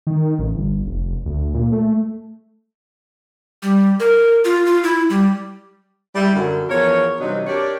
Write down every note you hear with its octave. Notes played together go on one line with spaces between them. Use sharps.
D#3
A1
G1
F1
D2
A#2
A3
G3
A#4
F4
F4
E4
G3
G3 E4
F#2 D3
E2 F3 B3 A#4 C#5
G2 C3 E3 F#3 D4 D#4
D4 G4 A#4 C#5 D5